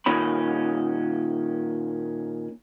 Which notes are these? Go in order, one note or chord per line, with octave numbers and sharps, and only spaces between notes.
A#2 D#3 C#4 B5